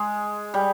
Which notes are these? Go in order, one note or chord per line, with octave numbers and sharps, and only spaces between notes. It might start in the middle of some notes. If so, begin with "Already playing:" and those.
Already playing: G#3
G3